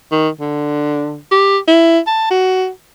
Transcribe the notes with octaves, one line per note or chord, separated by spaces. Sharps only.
D#3
D3
G4
E4
A5
F#4